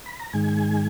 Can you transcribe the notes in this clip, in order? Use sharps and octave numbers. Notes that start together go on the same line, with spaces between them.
B5
A#5
G#2 D#3 G#3 G#5